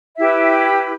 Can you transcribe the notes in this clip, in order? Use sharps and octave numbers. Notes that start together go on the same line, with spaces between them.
E4 G4 B4 E5
G5